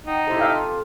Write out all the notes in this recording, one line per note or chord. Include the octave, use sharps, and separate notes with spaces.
D#4 F#5 G5
C3 E4 G4 A4 C5
E5 F5 G5
F4